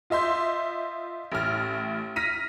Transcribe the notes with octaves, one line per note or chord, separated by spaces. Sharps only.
F4 D#5 E5 C6 G6
A1 A2 F6
F6 A#6 B6 D#7